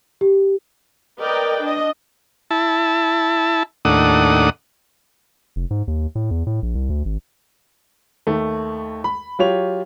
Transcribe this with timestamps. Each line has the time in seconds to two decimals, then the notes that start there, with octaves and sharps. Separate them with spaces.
0.21 G4
1.19 A#4 B4 D5 D#5 G5
1.61 D4 D#5
2.51 E4 A5
3.85 D#2 A2 D4 F#5 D#6
5.56 F1
5.71 G#2
5.88 D#2
6.15 A2
6.31 E2
6.47 A2
6.62 A#1
6.75 C2
6.90 D2
7.05 G#1
8.27 D#2 A3
9.04 B5
9.39 F#3 F4 G4 C#5 F7